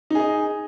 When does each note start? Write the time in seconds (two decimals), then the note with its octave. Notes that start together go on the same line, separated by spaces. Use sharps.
0.10 D#4
0.15 G#4
0.20 D#5